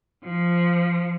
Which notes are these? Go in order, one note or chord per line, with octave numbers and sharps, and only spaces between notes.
F3